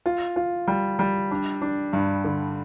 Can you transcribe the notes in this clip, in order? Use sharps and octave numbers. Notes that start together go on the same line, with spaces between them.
F4
F4
G3
G3
D4
D4
G2
D3